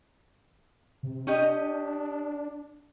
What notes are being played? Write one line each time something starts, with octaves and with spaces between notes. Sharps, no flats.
C3
C#4 D4 G4 D#5